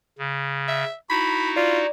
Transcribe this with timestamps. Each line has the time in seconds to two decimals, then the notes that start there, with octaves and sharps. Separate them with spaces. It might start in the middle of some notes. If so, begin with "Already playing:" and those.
0.18 C#3
0.68 E5
1.10 D#4 E4 F#4 B5
1.56 F4 D5